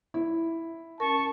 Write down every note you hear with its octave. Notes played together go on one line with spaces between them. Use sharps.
E4
C#4 A#4 A5 C#6